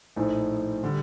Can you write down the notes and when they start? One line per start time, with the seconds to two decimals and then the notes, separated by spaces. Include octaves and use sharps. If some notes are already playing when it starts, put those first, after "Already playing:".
0.16 A#1 A2 F3 A3 D#4
0.84 D3 G3